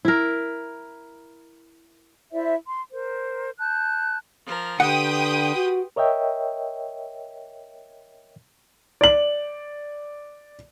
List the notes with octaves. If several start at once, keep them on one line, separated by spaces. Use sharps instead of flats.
E4 A#4
E4 C5 D5 E5
C6
A#4 C5
A5 F#6 G6
F3 A#4
D3 G4 B4 F#5 G5 C6 D#6
F#4
A#4 C#5 D#5 E5 G5
D5 F#7